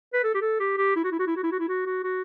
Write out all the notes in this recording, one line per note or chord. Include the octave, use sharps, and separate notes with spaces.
B4
A4
G4
A4
G4
G4
E4
F#4
E4
F#4
E4
F#4
E4
F#4
E4
F#4
F#4
F#4